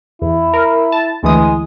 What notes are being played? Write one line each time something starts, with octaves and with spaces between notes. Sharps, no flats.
E2 E4
A#4
A5
D2 E3 G#3 D#6